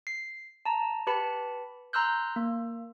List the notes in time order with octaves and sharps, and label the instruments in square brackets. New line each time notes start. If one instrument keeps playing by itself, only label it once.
[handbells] C7
A5 A#5
G4 B4 A5 B5 C#7
A#5 C6 E6 F#6 G6
A#3